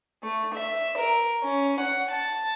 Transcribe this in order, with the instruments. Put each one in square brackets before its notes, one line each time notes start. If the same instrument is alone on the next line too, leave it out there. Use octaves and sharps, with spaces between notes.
[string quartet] A3
E5
A#4
C#4
F#5
A5